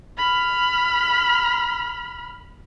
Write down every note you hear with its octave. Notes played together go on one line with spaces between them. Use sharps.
B5 F6